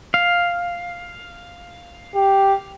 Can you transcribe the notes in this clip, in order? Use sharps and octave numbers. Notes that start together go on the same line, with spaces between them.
F5
G4